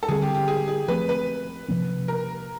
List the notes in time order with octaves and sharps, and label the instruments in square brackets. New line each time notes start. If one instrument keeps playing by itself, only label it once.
[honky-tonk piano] A4
[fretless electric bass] D3 G3 C4 [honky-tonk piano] G#4
[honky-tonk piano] G4
G4
G#4
G#4
[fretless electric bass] F3 A3 C4 [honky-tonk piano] B4
[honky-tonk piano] B4
[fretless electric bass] C3 F3 A#3 C#4
[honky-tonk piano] A#4